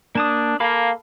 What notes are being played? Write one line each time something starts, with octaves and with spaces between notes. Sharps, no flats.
A#3 D4 A5 D#6
A#3 A4 F5 B5